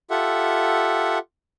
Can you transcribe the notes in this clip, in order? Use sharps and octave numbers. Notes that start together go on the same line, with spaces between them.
F4 G4 A4 E5 F#5